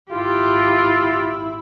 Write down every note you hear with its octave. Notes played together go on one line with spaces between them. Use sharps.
G#1 E4 F4 G4